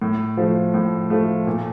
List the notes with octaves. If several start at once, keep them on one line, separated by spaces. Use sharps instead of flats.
A2
F3 A3
A2
F3 A3
A#2